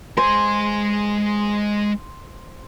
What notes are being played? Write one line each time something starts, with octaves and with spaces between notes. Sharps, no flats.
G#3 C5 G#5